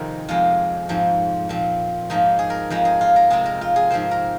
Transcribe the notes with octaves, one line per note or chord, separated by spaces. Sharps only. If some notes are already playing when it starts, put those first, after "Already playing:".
Already playing: F2 C3 D#3 C4 G#4 A#4
F2 C3 G#3 F4
G#2 F3 C4
A#2 F3 C4
G#2 F3 A#3 D#4
G#4
A#4
F2 F3 G#3 A#4
G#4
F4
A#4
C3 G#3 C4 G#4
A#4
F4
G#4
G#2 F3 C4 C5
A#4